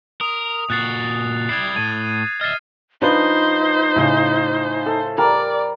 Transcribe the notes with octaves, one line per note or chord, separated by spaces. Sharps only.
A#4 D#6 F7
A#2 F#4 F#6 A6 C7
G3 E4 G#6 A6 C7
A2 G#6 D#7
D#5 E5 F6 A6 C7
F3 D4 D#4 B4 C5
A2 C#3
A4
G3 A#4 D5 A#5